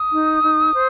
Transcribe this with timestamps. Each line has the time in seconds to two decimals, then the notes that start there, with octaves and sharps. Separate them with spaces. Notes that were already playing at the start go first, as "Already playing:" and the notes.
Already playing: D#6
0.12 D#4
0.43 D#4
0.74 C5